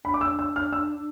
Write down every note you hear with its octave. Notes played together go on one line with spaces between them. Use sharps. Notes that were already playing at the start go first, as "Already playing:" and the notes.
D4 B5
D6
E6
E6
F6
E6